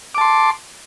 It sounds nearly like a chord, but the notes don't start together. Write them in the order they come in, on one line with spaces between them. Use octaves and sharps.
D6 A5 C6